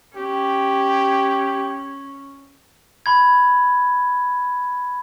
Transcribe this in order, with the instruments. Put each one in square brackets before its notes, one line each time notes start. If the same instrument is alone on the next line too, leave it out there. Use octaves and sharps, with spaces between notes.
[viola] C#4 [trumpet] G4
[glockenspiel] B5 G#6